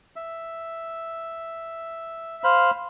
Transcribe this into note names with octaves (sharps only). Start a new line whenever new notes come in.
E5
C5 F5 B5